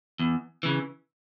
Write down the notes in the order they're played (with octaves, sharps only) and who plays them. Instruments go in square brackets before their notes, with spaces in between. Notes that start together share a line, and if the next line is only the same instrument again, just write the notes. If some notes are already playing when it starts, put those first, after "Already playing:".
[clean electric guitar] E2
C#3 E3